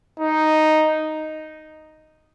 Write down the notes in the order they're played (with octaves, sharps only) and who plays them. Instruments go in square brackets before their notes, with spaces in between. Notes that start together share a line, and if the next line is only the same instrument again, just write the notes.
[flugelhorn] D#4